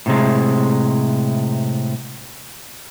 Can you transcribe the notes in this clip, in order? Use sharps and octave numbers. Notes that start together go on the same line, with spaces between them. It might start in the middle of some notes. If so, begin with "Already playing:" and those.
A2 C3 G#3